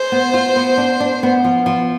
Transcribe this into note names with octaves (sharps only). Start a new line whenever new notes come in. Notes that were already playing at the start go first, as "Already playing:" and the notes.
Already playing: G#4 C5
B3
F4
B3
D4
D4
B3
F3
F3